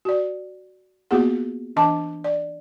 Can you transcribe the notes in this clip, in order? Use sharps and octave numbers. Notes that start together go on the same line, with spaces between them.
F#4 D5
A#3 B3 F4 F#4 G#4 F#5
E3 D4 D#5 A5 D6
D5